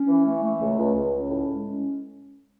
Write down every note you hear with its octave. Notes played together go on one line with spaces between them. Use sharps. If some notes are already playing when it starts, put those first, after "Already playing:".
Already playing: C#4
E3
A3
A3
C#2
C#2
C#2
C#4
A2
G#3
C#4